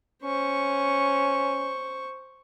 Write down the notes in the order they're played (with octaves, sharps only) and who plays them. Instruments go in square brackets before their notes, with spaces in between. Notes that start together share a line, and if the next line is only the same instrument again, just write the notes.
[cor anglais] C#4 [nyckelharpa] C5 C#6